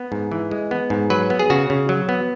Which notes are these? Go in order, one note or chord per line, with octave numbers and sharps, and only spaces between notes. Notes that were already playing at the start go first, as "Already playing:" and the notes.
Already playing: B3
G#2
E3
G#3
B3
G#2
F#3 B4
B3
G#4
C#3 F#4
C#3
F#3
B3